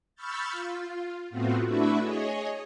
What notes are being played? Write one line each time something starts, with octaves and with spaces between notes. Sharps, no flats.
B5 C#6 E6 F6 G6 A6
F4
A2 A3 B3 C4 F4 F#4
A3 D4 E4 F#4 B4 E5
G#4 C#5 D#5